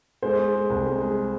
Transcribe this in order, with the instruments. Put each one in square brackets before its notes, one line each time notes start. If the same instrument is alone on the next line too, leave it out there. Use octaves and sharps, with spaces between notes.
[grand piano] G#3 C5
G#3
G#3
C2
G#3
G#3